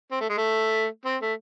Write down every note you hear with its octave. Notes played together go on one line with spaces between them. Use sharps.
C4
A3
G#3
A3
C4
A3